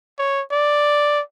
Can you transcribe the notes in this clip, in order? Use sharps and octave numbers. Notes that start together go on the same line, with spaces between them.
C#5
D5